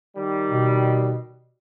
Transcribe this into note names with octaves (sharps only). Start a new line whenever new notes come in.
D#3 G3
B2